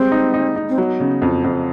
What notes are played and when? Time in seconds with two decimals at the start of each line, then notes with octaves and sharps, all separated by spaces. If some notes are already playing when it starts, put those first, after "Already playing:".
Already playing: G3 G#3 C4
0.12 D#4
0.34 D#4
0.56 D#4
0.69 C4
0.78 F#3 B3
1.00 C#3
1.22 F2
1.44 F2